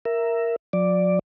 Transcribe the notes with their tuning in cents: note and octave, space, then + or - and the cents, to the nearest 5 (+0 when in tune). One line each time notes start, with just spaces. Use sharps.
A#4 +0 E5 +10
F#3 -45 D5 +0